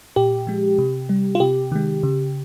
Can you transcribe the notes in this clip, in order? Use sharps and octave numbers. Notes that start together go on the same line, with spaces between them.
A#2 G4
F3 G#3
C3
G3
F4
C3 G4
D#3 G#3
C#3